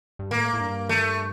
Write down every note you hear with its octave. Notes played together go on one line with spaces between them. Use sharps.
G2
A2 A#3
A2
G2
A3